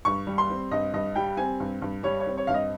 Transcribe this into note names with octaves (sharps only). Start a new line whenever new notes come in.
G2 C#6
G3
C6
C4
G2 D#5
G2 D#5
G3 G5
C4 G#5
G2
G2
G3 C#5
C#5
C4
C#5
G2 F5
D#5